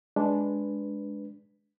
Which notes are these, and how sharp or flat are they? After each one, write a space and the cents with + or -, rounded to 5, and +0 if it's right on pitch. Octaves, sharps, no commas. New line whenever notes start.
G#3 +5 D4 -5 B4 +0